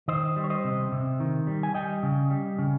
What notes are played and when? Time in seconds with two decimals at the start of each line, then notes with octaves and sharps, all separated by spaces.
0.08 D#3 C5 D#5
0.36 G3
0.44 C#5
0.50 C5 D#5
0.64 C3
0.92 C3
1.20 D#3
1.47 G3
1.63 G#5
1.74 G3 D#5 G5
2.03 C#3
2.30 G3
2.58 C#3